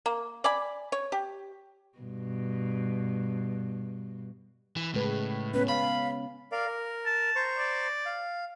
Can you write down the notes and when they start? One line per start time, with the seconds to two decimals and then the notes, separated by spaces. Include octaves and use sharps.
0.06 A#3
0.44 D5 G#5 B5
0.92 C#5
1.12 G4
1.98 G2 B2
4.76 E3
4.94 A2 C#3 G#3 B4
5.54 B3 C#4 B4
5.68 F5 B5
6.52 A#4 D5 F5
6.66 A#4
7.06 A5
7.36 C5 A#5 C#6
7.58 D5
8.06 F5